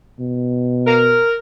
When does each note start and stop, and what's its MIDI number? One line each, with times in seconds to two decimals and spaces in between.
0.19 1.22 47
0.87 1.36 70